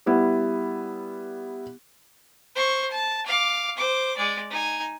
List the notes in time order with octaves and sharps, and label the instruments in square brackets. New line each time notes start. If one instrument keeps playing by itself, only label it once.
[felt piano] G3 B3 E4
[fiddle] C5 C#6
A5
F5 D6
C5 D6
G#3 D5
D#4 G#5